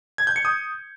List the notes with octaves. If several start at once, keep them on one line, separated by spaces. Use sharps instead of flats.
G#6
G6
C#7
D#6